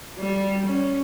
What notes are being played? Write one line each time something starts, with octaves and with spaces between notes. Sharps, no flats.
G3
C#4